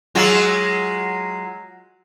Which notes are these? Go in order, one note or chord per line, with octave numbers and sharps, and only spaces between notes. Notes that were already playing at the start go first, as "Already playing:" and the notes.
F#3 G#3 F4